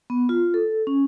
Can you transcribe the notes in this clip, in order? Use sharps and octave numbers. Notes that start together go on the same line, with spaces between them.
B3
F4
A4
C#4